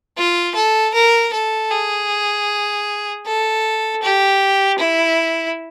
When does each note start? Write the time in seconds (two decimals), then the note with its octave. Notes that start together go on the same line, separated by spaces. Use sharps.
0.17 F4
0.55 A4
0.94 A#4
1.33 A4
1.71 G#4
3.25 A4
4.02 G4
4.79 E4